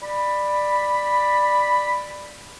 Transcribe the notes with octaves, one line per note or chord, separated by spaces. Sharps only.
D5 B5